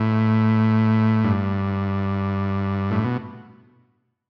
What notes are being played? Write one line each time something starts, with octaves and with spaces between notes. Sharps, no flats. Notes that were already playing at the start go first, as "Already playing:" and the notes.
Already playing: A2
G2
A2
B2